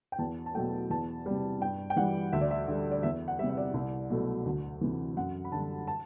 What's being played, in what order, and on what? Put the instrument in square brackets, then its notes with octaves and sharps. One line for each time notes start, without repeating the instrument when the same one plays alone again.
[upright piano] G5
E2 A5
A5
B2 F#3 A3 G5
E2 A5
C3 G3
G2 G5
G5
E3 G3 F#5
D2 E5
D5
E5
D3 G3
D5
E2 E5
F#5
G3 E5
C3
E5
D5
C2
B2 F#3 A3
D2
C3 E3
F#2 F#5
B5
D3 G3 A5
A5